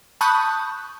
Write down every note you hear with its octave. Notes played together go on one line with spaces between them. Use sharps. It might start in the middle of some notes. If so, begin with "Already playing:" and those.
A5 B5 C#6 D#6 F#6 G6